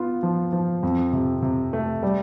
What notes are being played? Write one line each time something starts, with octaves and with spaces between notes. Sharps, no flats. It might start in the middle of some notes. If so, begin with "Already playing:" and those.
Already playing: B3 F4
F3
F3
F2
C3
C3
A3
G3